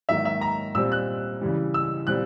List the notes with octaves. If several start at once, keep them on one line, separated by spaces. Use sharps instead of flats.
G#2 D#3 F#3 A#3 E5
E5
A#5
A#2 G3 C4 E6
F#6
C#3 E3 G3
E6
A#2 G3 C4 F#6